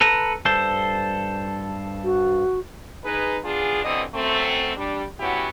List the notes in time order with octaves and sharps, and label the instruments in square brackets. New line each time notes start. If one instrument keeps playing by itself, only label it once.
[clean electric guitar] A4 B4 A#5
G2 A4 C5
[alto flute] F#4
[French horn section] D#4 G#4 B4
B3 D4 F4 G#4
G2 B2 D3 E3 C4 D#5
F#2 A3 C4
G3 D4
F#3 B3 C#4 E4 F#4 G4